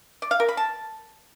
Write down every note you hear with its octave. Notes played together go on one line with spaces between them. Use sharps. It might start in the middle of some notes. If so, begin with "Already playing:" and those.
D5
F5
A#4
B5
A5